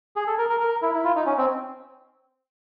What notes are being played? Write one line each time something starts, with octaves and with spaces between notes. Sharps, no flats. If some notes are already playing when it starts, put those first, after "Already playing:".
G#4
A4
A#4
A#4
A#4
E4
E4
F4
D#4
C#4
C4